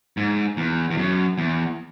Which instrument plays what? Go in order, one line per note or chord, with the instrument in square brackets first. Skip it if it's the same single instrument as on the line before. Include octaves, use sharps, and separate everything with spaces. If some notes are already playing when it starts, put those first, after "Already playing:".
[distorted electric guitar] G#2
E2
E2
F#2
E2